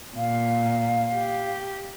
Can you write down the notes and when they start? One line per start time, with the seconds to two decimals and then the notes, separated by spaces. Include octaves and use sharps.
0.16 A#2 F5
1.13 G4